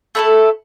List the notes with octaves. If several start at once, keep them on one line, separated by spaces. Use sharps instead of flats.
A3 E4 A4